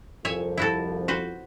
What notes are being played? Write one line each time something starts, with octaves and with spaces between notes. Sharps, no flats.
C2 F2 C#5 E5 G#5
E4 F#4 A4
F#4 B4 C5